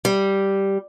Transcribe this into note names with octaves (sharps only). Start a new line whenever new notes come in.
G3